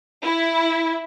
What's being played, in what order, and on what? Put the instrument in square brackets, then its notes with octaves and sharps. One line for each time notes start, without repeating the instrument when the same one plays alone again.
[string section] E4